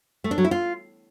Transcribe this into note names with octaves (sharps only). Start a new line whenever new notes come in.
A3
D4
F#3
E4
F4